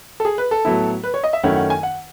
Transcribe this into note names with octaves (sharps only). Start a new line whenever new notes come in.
A4
G#4
B4
A4
A2 F#3 B3 E4
B4
C#5
D#5
E5
F#2 D#3 A3 C#4 E4 F#5
F#5
G#5
F#5